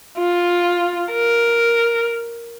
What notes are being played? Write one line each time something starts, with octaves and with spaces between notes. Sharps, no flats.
F4
A#4